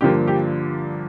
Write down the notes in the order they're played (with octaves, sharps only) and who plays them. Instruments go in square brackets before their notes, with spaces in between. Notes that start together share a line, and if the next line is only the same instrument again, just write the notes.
[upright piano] G2 D3 F3 A#3 G4
G4